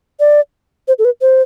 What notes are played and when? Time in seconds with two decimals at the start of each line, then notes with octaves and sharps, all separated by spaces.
0.20 D5
0.88 C5
0.99 A4
1.05 B4
1.21 C5